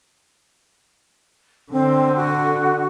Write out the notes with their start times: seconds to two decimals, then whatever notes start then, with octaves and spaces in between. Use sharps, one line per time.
1.72 D3 C4
2.16 F#4